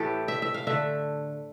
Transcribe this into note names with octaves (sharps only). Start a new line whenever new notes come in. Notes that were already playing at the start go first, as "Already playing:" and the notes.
Already playing: A2 E3 A3 G4 A4
E5
E5
F5
D3 A3 E5